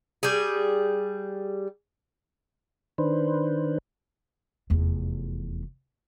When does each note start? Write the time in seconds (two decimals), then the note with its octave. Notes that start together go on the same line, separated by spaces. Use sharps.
0.23 G3 G#4
2.98 D#3 D4 B4 C5
4.70 F1 E2